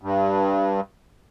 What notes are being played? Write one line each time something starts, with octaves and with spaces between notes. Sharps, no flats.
G2